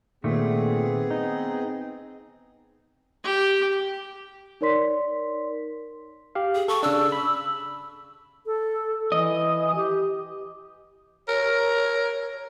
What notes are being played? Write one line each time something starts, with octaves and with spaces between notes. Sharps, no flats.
A#2 D#3 A3 B3 C4 G#4
D#4
G4
D#4 A#4 C#5 D5 C6 B6
G4 F5
G#4
A4 C#6
C#3 D4 E6
B5
A4
E3 D#5
G4
A#4 C#5